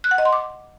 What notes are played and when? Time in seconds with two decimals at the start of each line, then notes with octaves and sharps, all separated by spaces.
0.04 F#6
0.11 F#5
0.18 D#5
0.25 C6
0.33 D6